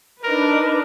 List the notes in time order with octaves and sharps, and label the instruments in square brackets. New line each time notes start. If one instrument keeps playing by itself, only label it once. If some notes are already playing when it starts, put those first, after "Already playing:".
[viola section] D4 D#4 B4 [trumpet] A#4